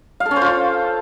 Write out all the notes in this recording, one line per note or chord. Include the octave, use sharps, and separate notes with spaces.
F5
A4
C#4
C5
F4